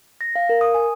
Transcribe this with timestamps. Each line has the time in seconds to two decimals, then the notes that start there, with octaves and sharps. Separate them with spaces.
0.21 A#6
0.36 F5
0.49 A#4
0.61 D#6
0.74 G#5